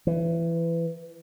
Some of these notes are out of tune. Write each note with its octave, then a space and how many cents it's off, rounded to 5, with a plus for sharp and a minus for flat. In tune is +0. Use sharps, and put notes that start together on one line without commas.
E3 +20